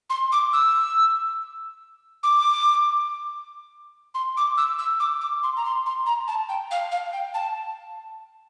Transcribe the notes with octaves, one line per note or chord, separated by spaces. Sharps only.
C6
D6
E6
D6
C6
D6
E6
E6
D6
D6
C6
A#5
C6
C6
A#5
A5
G5
F5
F5
G5
A5